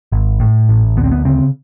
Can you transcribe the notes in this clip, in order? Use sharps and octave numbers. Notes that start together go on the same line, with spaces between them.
G#1
A2
A1
D2 B3
C4
B3
C#3 C4